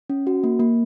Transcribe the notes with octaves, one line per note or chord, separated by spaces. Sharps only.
C#4
F#4
A#3
A#3